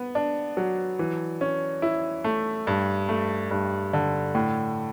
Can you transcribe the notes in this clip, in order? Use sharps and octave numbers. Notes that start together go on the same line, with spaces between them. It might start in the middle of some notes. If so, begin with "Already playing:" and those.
Already playing: B3
D4
F#3
E3
C#4
E4
A3
G2
A3
G2
D3
A2